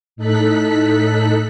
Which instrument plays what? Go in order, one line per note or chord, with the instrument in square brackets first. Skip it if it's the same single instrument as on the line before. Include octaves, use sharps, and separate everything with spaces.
[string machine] A2 D#4 A4 F#6 B6